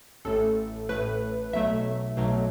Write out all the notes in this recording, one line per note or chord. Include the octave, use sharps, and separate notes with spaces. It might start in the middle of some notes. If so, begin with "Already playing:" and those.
A1 A2 A3 A4
A1 A2 A3 B4
B1 B2 F#3 A3 E5
B1 B2 F#3 A3